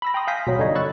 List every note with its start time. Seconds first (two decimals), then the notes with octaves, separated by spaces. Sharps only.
0.02 B5 E6 A#6
0.14 G5 A#5 C6 D#6
0.27 F5 G#5 G6 A#6 B6
0.47 B2 F#3
0.59 G2 D3 G3 D#4 C#5 D#5
0.75 B5 C#6 E6 F#6 A6